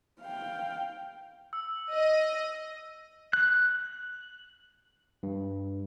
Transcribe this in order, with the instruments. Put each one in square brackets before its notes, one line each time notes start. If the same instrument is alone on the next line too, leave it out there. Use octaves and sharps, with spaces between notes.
[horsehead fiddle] F5 G5
[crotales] E6
[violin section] D#5
[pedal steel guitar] F#6
[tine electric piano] G2